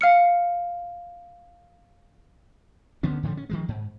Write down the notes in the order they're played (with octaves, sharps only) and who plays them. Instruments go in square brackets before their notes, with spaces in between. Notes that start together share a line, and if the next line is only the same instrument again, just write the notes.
[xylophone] F5 F6 C#7
[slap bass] D2 D3 B3 C#4
A2 D3 F3 A3
C#4
D#3 F3 G#3
G#2